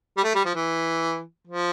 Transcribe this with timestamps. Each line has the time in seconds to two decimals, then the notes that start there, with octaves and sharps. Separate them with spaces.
0.17 G3
0.24 A3
0.35 G3
0.45 F3
0.55 E3
1.48 F3